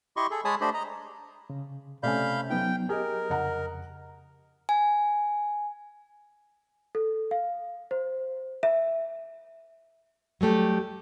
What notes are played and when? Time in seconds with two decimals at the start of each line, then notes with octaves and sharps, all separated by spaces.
0.17 E4 G4 D#5 C6 C#6
0.31 G#4 A4
0.45 G#3 C#5 G#5 A5 B5 D#6
0.61 A3 D4 G4 C5 D#5 B5
0.74 D#5 A#5
1.50 C#3
2.03 C3 A3 C#4 D5 F5 B5 G6
2.50 F#3 B3 D#4 G5
2.89 G4 G#4 A#4 D#5
3.30 F2 C#3 D#5 F#5 A#5
4.69 G#5
6.95 A4
7.31 F5
7.91 C5
8.63 E5
10.41 F#3 G3 A3 G4